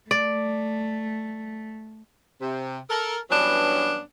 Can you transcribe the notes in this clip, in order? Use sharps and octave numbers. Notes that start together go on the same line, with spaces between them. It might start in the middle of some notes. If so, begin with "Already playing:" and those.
A3 D5
C3
A4 A#4
G2 E3 F#3 B3 C#4 D4